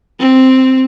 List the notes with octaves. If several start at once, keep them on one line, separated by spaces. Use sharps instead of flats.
C4